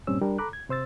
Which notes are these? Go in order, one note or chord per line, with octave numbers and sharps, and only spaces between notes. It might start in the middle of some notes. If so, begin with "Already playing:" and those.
G2 A#2 G3 C4 C#4 E6
G3 D4 A#4
A4 A#5 B5 D6 F#6
G#6
C3 C5 E6 A6